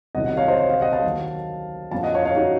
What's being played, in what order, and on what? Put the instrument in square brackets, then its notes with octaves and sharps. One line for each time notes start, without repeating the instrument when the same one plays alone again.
[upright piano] C2 C3 D#3 F#3 D#5 F#5
D#5 F#5
C#5 F5
C5 D#5
C#5 F5
C#5 F5
D#5 F#5
F5 A5
D#2 D#3 F#3
F#2 F3 F5 A5
D#5 F#5
C#5 F5
C#5 F5
D#4 F#4